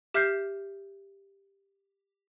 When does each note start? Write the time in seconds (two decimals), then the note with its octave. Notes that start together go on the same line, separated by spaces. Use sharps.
0.14 G4 E5 F6 G6 C7